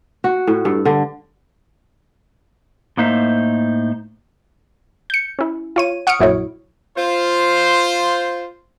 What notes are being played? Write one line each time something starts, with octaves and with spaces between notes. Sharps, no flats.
F#4
A2
G2
D3
A2 A#3 D#4 C5 E5
G6 C#7
C#4 E4
F4 C#5 D#7
F#5 C#6 D#6 F6 C#7 D7
A#1 F#2 E4 F#4 C#5
F4 C5